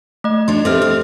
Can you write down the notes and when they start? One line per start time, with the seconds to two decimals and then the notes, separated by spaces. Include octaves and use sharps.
0.24 A3 D#5
0.48 F#3 D4 D#5 C6
0.65 C4 G4 A4 B4 E5 F6
0.82 C4